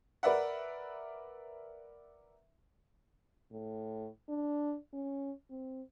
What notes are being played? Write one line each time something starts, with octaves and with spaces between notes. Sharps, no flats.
A#4 B4 D5 E5 F#5
A2
D4
C#4
C4